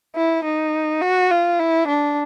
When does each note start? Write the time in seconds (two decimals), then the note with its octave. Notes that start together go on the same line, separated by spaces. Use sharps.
0.16 E4
0.44 D#4
1.01 F#4
1.30 F4
1.59 E4
1.88 D4